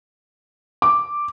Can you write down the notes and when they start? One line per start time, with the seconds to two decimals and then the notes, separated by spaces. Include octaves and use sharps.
0.82 D6